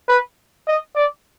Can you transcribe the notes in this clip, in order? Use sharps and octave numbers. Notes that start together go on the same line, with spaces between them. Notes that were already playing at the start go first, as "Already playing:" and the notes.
B4
D#5
D5